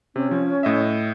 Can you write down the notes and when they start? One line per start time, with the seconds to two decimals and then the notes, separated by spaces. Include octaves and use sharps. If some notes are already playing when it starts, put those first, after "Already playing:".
0.16 C3 C#4
0.31 F3
0.63 A2 D#5 E5